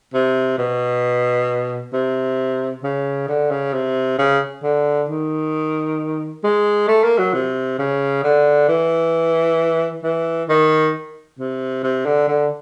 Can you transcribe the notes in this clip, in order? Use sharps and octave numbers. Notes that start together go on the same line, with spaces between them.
C3
B2
C3
C#3
D3
C#3
C3
C#3
D3
D#3
G#3
A3
A#3
F#3
C3
C#3
D3
E3
E3
D#3
C3
C3
D3
D3